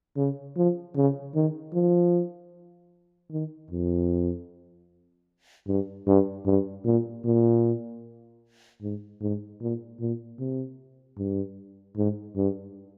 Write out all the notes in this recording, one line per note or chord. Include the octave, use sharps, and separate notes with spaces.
C#3
F3
C#3
D#3
F3
D#3
F2
G2
G2
G2
A#2
A#2
G#2
G#2
A#2
A#2
C3
G2
G#2
G2